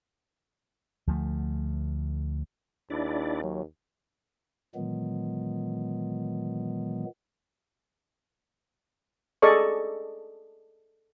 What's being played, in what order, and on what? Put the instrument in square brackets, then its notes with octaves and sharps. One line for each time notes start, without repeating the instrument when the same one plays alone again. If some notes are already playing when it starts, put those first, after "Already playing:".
[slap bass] D2 F3 A3
[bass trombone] D#2 [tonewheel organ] D4 E4 D5
[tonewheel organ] F#3
[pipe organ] A#2 D#3 E3 F#3 G#3 B3
[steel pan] G#4 A4 D5 D#5 C#6